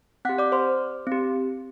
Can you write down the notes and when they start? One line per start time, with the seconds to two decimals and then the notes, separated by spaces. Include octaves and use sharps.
0.25 C4 F#5 F#6
0.29 G4
0.38 D5 D6
0.52 C5 C6
1.07 C4 G4